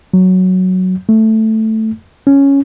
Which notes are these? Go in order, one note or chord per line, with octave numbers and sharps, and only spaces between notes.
F#3
A3
C#4